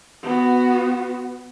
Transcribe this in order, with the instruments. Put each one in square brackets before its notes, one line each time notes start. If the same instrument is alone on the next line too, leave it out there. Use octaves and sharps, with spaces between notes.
[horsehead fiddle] B3 F#4